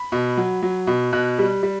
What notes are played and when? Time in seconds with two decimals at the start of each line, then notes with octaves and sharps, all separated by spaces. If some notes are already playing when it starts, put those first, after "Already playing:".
Already playing: B5
0.12 B2
0.37 F#3
0.62 F#3
0.87 B2
1.13 B2 F#6
1.39 G3
1.63 G3